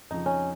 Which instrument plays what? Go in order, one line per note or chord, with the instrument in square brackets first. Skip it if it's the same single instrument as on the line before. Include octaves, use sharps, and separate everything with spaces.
[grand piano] F2 C#3 F3 [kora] D#4
[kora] C#4